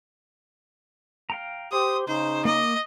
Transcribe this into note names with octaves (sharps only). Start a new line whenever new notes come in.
F5 G5 A#5
G4 C5 C6 D#6
C#3 D#4 C5
A#3 D#5 D6